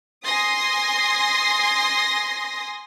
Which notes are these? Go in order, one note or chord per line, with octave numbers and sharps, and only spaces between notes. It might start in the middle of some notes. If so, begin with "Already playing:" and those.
G#5 C6 D#6 A#6